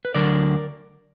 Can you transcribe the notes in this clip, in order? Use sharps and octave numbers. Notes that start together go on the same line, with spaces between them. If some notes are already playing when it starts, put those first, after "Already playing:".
B4
D2 D3 F#3 A#4 D5